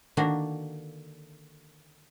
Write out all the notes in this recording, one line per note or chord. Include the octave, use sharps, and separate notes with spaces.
D3 D#3 A#3 D4 F#4